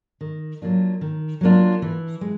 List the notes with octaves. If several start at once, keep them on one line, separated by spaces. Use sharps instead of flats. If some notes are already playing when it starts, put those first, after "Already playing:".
D#3
F#3 A#3 D4 F4
D#3
F#3 A#3 D4 F4
E3
G#3